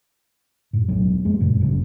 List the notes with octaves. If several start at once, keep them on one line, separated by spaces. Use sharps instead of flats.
F#2 A2
E1 B1 F#3
F2 G#3 A#3
F#2 A#2 C#3
G1 F#2 A2 C#3